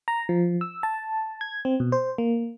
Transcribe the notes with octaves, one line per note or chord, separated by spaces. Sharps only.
A#5
F3
E6
A5
G#6
C4
B2
C5
A#3